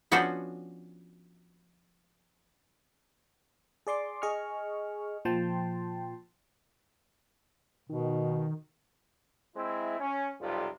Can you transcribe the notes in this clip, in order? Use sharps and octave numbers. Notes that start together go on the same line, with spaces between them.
F3 B3 C#4 D4 F#4 C5
G#4 D5 C6 D6
G#4 D#5 G#5 C#6 F6
A#2 F3 G5 A5 C6
B2 D#3
G#3 C4 E4
C#4
B1 F2 C3 F3 G3